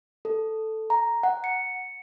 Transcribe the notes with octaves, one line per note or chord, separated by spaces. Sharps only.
A4
A#5
F#5
C#7